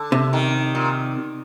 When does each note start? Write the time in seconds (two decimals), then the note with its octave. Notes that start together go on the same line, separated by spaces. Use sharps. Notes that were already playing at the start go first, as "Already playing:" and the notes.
Already playing: D3
0.12 C3
0.33 D#3
0.75 A#2